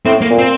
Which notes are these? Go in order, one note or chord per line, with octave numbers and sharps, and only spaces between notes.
A2 C4
A#3
A#2
C4